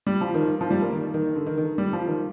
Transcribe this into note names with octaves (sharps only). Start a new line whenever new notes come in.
G3
F3
D#3
F3
G3
A#3
D#3
D#3
D3
D#3
D#3
G3
F3
D#3